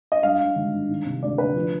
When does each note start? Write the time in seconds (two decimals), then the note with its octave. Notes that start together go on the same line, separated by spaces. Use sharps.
0.12 D#5
0.23 G2 F5
0.40 G2
0.56 G#1
0.73 G2
0.89 D#3
1.06 C3
1.22 D2 D5
1.38 D2 B4
1.55 F3